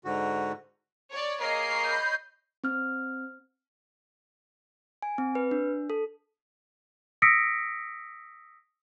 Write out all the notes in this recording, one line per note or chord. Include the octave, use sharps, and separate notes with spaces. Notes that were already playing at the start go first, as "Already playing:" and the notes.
G#2 D3 F#4
C#5 D5
A#3 G#4 A#4 C#5 D#5 C7
B5 G6
C4 F6
G#5
C4
B4
D4
A4
D#6 E6 A#6 B6 C#7 D7